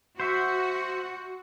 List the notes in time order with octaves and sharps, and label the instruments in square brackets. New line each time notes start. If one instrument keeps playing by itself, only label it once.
[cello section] F#4 [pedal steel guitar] C5 E5